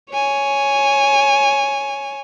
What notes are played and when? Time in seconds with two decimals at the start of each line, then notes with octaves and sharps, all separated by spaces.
0.12 C#5 G#5